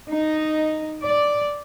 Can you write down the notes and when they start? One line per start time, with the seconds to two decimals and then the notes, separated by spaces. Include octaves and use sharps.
0.10 D#4
1.04 D5